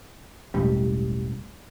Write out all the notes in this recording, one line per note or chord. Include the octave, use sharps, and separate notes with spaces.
E1 A1 G3